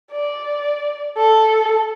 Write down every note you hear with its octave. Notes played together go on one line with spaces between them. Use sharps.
D5
A4